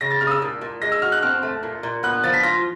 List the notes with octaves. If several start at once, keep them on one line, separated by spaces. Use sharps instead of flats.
C#3 A#6
A6
C#3 F6
D#6
E6
A#2
A#2
G#3 A#6
E6
F#4 F6
F#6
C4 F6
A3
A#2
A#2
B3 F#6
F3 A6
B6
F4 A#6